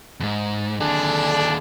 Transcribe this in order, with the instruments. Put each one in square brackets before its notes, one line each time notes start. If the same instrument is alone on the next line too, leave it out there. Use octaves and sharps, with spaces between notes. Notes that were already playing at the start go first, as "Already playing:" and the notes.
[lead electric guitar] E2 G#2
[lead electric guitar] D#2 G#4 [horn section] D3 D4